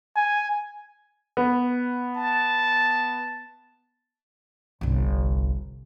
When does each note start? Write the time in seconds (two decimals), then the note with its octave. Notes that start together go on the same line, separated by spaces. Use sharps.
0.16 G#5
1.37 B3
2.16 A5
4.81 G1 C2